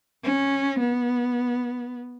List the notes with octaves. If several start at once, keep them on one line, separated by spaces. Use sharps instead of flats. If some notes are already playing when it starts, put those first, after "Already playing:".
C#4
B3